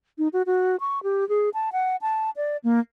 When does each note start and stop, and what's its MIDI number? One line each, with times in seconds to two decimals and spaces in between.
0.18 0.28 63
0.33 0.42 66
0.46 0.76 66
0.80 1.02 85
1.03 1.27 67
1.29 1.49 68
1.54 1.69 81
1.72 1.96 78
2.01 2.30 81
2.36 2.57 74
2.64 2.80 58